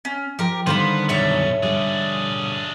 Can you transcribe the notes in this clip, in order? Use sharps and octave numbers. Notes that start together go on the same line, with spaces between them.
C#4
F3 G4 A#4
D3 D#3 G3 B3 C5 F5 B5
F#2 B2 A4 C#5 E5
D3 G3 D4 G#4